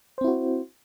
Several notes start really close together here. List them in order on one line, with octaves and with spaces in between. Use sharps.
C5 C4 E4 F#4